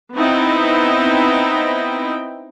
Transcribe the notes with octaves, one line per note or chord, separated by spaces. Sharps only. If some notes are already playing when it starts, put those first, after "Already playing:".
B3 C4 D#4 E4 D#5 G5